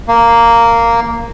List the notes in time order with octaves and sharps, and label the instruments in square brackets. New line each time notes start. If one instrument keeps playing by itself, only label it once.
[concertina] A#3